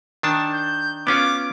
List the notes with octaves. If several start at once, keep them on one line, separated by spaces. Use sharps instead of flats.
D#3 D4 A5
G6
B3 C#4 F4 D6